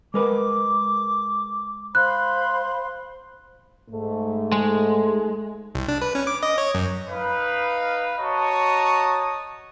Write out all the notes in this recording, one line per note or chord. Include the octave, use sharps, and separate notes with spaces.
G#3 A#4 B4 D6
C5 F5 B5 C6 F#6
G#2 A3
G#3
C2
D4
B4
C#4
D6
D#5
C#5
F#2
D#4 B4 F5
F#4 C#5 D#5 A5 A#5 D#6